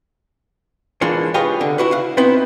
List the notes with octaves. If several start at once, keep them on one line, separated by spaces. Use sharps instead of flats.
E3 G#3 A#3 D4 F4 C#5
F4 G4 G#4 B4 C#5 D#5
D3
E4 F#4 B4
F5 F#5
B3 C4 D#4 E4 B4